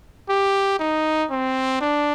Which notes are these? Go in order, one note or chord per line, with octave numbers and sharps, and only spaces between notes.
G4
D#4
C4
D4